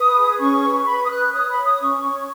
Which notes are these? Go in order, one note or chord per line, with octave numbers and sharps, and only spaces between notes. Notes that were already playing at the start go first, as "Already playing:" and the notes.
Already playing: B4 D#6
G#4
C#4 C#6
B4
B4 B5
D#6
B4 F#6
C#5 D#6
B5
C#5
D#6
C#4 C#6
C#5